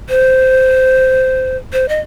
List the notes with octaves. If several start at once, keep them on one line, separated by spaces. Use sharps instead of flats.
C5
C5
D#5